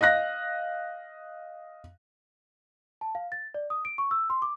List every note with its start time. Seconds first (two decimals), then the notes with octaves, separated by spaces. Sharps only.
0.01 D#5 F5 F#6 A#6
3.01 A5
3.15 F5
3.32 A6
3.54 D5
3.70 D#6
3.85 D7
3.98 C#6
4.11 E6
4.30 C6
4.42 D6